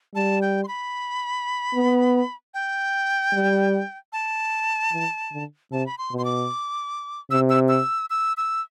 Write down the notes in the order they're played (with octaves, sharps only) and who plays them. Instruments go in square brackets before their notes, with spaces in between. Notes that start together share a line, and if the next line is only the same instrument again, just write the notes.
[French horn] G3 [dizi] A5
[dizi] G5
C6
B5
[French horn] B3
[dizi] G5
[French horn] G3
[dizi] A5
[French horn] E3
D3
[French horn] C3 [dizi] A5
[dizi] B5
C6
[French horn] B2
[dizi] C6
D6
[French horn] C3 [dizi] E6
[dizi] E6
E6
E6
E6